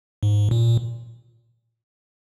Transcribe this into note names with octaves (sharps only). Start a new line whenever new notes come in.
G#2
A#2